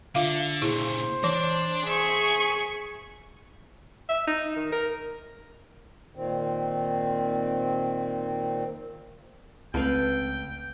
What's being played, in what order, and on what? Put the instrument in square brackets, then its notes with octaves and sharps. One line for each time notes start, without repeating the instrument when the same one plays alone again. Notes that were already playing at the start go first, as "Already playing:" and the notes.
[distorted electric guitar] D3 [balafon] F4 E5 F5
[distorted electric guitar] A#2 C#3 [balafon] E4 G#4 [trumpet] C5
[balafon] E3 [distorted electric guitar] D4 D5
[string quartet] G#4 C#6 [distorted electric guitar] E5
[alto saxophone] E5
D#4
D#3
A#4
[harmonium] A#2 D#3 C4
[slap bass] C#2 [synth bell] A3 C4 [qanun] A4 B4 F5 [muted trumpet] G5